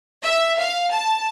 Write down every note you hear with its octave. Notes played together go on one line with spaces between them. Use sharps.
E5
F5
A5